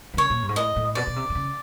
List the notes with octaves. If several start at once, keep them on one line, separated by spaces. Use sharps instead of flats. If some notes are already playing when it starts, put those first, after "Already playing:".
D3
C#3 C#5
A#2
G2
G#2
A2 D#5
A2
B2 D5
B2
C3
D3
C#3